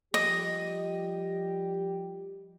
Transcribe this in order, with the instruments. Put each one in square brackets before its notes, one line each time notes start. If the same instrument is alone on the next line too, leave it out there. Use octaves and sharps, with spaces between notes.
[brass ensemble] F3 G3 G4 [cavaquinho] D#5